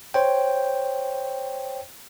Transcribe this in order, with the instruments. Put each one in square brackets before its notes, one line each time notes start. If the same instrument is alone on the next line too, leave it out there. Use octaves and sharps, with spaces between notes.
[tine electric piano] C5 C#5 G5